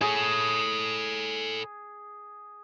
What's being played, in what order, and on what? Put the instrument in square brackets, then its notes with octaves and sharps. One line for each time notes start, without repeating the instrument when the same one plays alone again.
[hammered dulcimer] G#4 [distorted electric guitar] A4 C#5